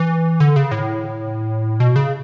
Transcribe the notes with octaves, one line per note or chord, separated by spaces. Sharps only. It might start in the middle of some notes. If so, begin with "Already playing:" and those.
Already playing: E3
D3
C#3
A2
B2
C#3